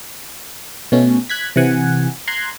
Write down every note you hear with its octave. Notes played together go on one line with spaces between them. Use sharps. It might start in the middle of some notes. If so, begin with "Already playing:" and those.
B2 A3 C#4
F#6 G#6 B6
C3 E3 F#5 G#5
A#5 C6 F#6 G#6